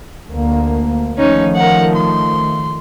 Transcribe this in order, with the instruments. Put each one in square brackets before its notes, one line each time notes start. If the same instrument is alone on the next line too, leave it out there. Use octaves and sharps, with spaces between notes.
[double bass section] D2 A#3
[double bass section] D#3 F3 A3 [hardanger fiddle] C#4 D#4
[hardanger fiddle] A#4 F#5
C6